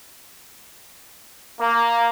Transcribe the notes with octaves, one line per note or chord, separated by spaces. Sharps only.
A#3